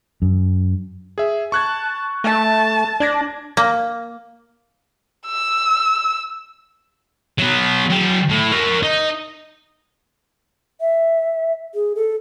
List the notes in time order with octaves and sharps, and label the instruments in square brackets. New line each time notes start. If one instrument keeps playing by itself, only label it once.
[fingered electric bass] F#2
[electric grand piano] G#4 E5
[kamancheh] A5 [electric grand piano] C#6 F#6 G#6
[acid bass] A3 [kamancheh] A5
[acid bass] D4 [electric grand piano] D5 G#6 A#6
[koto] A#3
[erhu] E6
[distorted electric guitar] F#3 B3
F#3 G5
A2
A#4 C#5
D#4
[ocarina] E5
G#4
A4